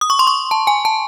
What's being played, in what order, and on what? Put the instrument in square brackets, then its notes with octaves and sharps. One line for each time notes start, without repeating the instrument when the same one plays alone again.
[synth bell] D#6
C#6
C6
C#6
A5
G#5
A5